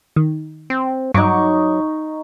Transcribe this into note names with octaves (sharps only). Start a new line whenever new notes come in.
D#3
C4
G2 F#3 D#4 C#6 D6